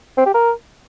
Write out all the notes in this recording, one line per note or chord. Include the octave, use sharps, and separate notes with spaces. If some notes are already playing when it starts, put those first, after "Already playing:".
C4
G4
A#4